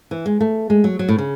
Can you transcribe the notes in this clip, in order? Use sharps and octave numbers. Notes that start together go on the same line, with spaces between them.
E3
G#3
A3
G#3
F#3
F#3
A2
C#3